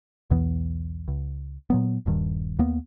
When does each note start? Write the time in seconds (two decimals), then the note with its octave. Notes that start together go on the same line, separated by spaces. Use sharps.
0.30 B1 E2 E3 B3
1.08 C#2
1.70 A#2 F#3 B3
2.06 D#1 G2 D#3
2.59 D#2 A#3 B3